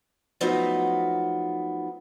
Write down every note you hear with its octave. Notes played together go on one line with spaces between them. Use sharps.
F3 F#3 A3 B3 D#4